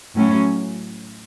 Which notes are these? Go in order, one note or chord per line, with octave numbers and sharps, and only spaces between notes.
A2 F#3 C#4